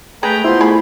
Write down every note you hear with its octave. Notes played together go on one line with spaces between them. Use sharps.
A3 G#4 B4 G5 A#5
B3 E4 F4 C5 C6
A3 G#4 B5